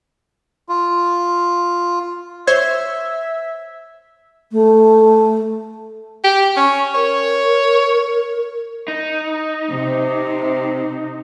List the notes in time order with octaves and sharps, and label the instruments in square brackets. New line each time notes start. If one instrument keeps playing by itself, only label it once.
[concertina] F4
[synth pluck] C5 C#5 [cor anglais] E5 [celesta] G#6
[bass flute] A3
[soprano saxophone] G4
[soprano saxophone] C#4 [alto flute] C#6
[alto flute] A#4 [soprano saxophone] C#5
[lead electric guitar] D#4
[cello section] C3